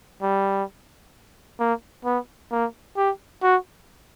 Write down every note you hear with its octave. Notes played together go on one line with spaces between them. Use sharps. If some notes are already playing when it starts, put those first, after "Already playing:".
G3
A#3
B3
A#3
G4
F#4